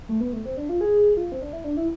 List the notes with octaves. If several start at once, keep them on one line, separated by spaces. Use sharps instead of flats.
A3
B3
A3
C4
D4
F4
G#4
F4
C4
D4
E4
D4
E4